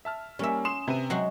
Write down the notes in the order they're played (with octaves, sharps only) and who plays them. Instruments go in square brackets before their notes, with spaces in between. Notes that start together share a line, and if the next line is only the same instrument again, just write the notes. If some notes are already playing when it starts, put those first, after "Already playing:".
[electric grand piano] E5 A5 F6
[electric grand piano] G3 A#3 [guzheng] C#4 E5
[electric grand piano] C6 D#6 C7 [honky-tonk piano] E7
[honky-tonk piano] C3 [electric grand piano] B4 D#7
[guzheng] F#3 G#3 F#4